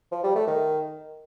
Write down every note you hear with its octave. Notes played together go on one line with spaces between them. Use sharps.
F3
G3
A3
D#3